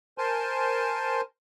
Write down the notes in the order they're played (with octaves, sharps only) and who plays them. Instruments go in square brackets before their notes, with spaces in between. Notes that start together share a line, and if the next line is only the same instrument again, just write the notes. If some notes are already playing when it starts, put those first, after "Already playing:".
[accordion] A#4 C5 G#5 A5 C6